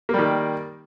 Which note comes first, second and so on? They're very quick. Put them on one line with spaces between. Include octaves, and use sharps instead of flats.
A#3 G3 D#3